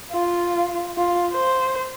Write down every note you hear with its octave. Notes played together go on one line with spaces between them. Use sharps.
F4
F4
C5